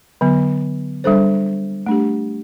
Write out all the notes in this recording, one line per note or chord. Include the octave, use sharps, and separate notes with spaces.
D3 F#3 B3
G3 D4 A4 C5
A3 D4 G4